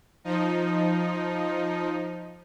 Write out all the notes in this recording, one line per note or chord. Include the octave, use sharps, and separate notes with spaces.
F3 D#4